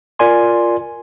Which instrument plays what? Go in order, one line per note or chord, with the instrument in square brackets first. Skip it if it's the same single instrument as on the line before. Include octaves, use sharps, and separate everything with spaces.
[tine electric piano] F4 A#4 D5 G#5 C6